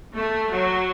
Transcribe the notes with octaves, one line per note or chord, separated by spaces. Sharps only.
A3
F#3